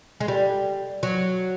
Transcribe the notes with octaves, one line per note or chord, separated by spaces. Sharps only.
G#3
G3
F#3